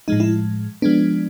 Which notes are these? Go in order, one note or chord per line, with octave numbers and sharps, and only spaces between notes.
A2 F3 G#3 D#4
E4
F3 G#3 B3 D4